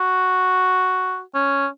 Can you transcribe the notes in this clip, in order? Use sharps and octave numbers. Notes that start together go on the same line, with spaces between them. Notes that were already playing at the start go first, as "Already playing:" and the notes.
Already playing: F#4
C#4